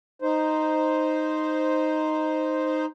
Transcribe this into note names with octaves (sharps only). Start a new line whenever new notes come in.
D#4 C5